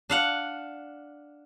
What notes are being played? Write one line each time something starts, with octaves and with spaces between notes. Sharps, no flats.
D4 F5 F#5